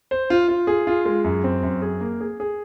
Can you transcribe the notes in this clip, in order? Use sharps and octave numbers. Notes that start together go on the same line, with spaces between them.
C5
F4
F4
G#4
F4
G#3
F#2
C4
F#2
G#4
A#3
G#4
G#4